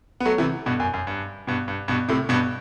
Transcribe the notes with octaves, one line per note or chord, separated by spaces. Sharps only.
B3
F#3 A3
C3 E3
G2 B2
F#2
F#2
G2
G2 B2
G2
G2 B2
A2 C3
G2 B2